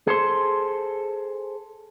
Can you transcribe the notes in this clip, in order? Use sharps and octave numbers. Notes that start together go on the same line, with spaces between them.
G#4 A4 C5